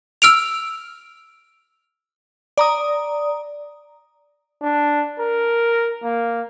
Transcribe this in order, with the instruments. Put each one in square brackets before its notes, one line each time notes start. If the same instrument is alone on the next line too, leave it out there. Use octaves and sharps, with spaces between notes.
[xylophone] E6 F6 D7 F7
[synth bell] D5 A#5 D#6
[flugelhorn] D4
A#4
A#3